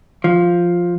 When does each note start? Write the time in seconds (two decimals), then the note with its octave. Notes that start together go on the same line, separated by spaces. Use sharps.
0.24 F3